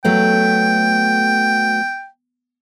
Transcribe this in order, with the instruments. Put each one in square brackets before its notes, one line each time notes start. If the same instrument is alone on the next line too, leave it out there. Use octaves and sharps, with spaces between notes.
[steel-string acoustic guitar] F#3 A3 B3 [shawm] G5